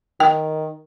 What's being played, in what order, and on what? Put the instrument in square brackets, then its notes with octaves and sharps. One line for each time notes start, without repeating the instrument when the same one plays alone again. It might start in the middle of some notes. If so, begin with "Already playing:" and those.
[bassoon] D#3 [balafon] G5